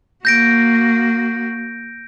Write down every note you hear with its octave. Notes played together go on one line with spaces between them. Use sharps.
A#3 F#4 G6 A#6 D7